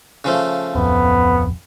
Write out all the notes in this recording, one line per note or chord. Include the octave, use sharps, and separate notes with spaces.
C#3 F3 A3
D1 F2 B3